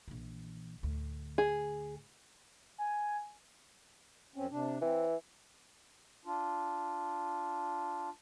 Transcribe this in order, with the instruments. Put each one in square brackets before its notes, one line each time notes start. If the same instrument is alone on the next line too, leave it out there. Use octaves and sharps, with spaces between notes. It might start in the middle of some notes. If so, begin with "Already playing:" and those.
[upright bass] A#1 E3
D2 A2
[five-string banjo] G#4
[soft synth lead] G#5
[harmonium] F#2 C4 C#4
C3 D4
[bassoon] E3 [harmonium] C4
[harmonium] D4 F4